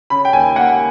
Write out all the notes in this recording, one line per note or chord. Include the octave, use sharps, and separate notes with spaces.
C#3 B5
G5
D#2 G#5
A#3 F#5